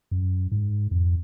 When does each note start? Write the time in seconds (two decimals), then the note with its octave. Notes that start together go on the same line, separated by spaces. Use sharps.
0.11 F#2
0.52 G#2
0.91 F2